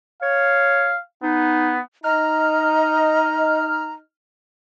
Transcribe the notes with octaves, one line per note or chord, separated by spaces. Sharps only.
C#5 F5
B3 D#4
D#4 D#5 A#5 F6